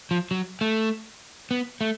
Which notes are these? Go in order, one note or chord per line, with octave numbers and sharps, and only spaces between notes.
F3
F#3
A3
B3
A3